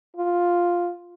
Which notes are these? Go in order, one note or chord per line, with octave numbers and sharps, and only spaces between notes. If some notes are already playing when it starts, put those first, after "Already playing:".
F4